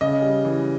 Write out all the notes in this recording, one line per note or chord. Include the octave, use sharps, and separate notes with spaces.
C#3 D#5
G3
E3